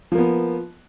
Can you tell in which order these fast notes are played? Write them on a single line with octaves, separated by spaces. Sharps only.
F3 A#3 B3